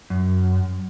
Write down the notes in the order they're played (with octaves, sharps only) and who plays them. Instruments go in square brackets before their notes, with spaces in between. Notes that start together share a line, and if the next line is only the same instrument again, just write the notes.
[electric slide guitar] F#2